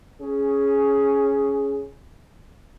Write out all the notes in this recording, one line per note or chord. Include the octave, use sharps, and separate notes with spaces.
C#4 G#4